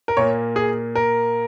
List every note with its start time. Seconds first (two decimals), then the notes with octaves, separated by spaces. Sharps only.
0.08 A#4
0.17 A#2 A#3 C#5
0.56 G#4
0.95 A#4